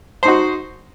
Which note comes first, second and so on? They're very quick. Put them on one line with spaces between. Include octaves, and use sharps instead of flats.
C5 D#4 F#4